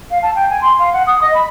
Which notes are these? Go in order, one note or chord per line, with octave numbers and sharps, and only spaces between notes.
F5
A5
G5
G#5
C6
F5
F#5
D#6
D#5
B5